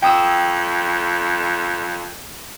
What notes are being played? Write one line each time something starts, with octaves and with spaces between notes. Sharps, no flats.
F2 G5 D#6 E6